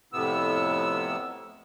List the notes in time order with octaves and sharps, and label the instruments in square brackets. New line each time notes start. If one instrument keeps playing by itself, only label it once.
[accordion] F2 A2 C3 B3 E6